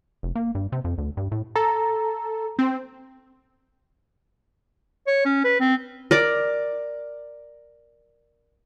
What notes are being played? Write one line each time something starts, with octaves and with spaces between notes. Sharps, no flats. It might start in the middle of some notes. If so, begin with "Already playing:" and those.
F1
A#3
G2
C3
F2
D2
G2
A2
A4 A#5
C4
C#5
C#4
B4
C4
A#4 D5 D6